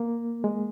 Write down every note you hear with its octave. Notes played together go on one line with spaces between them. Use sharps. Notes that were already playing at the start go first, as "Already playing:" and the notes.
Already playing: A#3
G#3